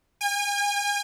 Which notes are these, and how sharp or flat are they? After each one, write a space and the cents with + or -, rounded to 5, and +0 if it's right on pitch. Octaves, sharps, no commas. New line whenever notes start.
G#5 -40